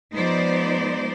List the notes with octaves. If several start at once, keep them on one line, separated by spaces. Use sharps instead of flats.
F3 G#3 B3 D#4 C5 D5